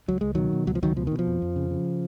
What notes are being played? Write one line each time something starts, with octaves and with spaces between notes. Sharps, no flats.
C#2 F#3
C#2 G#3
B2 D#3 F#3
B2
C#2 F#3
F3
C#2 D#3 F#3
B2 F3
B2 D#3
F3
F2
F2
C#3
C#3